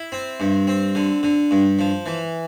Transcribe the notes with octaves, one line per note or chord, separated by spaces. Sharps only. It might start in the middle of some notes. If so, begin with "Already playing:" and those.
Already playing: E4
C4
G2
C4
D3
D3
G2
F3
E3